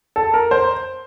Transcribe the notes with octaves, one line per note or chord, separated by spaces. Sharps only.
A4
A#4
C5